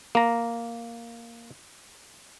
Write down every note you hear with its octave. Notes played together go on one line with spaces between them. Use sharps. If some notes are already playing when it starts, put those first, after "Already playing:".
A#3 A#5